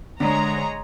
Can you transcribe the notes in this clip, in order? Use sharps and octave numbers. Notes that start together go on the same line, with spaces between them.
D3 G#3 D4 C#5 A#5